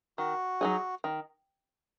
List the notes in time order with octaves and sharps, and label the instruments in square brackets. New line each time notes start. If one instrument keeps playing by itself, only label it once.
[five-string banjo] D#3 [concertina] F#4
[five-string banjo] F#3 D#4 G#4
D#3